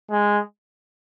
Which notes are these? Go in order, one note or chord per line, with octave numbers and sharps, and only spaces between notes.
G#3